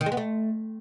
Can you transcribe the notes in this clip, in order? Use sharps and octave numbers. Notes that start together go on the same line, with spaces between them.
D#3
G#3
B3
A3